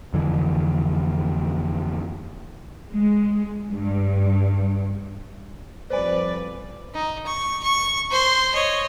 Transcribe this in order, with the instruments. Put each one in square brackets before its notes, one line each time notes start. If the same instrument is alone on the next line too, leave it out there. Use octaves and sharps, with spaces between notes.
[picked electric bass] F2 D3 E3
[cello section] G#3
G2
[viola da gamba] F2 G3 B4 [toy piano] C5 G#5 [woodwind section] D5
[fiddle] D#4
C#6
C#6
C5 C6
C#5 D#5